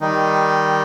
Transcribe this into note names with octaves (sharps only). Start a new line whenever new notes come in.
D#3 G3 D#4